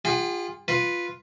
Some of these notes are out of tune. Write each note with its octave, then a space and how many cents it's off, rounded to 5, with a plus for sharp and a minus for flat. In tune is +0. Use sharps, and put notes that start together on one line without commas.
F4 +0 G#4 -45 F#5 +40
F4 +0 B4 -5